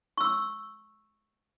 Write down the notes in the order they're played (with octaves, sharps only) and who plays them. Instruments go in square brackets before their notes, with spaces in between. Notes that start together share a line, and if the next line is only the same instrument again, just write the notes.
[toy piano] C#6 E6